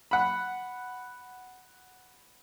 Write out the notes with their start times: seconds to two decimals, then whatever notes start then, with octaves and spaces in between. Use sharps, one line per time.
0.11 F#5 B5